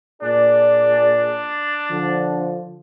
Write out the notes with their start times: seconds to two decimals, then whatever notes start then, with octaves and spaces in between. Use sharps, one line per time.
0.23 A#2 D4 G#4 D5
1.91 D3 F3